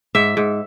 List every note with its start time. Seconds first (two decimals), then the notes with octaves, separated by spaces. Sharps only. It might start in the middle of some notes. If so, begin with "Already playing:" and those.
0.15 G#2 E5
0.37 G#2